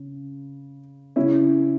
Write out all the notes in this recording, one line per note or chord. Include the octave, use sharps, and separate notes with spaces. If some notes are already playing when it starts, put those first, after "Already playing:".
Already playing: C#3
C#3 G#3 C#4 E4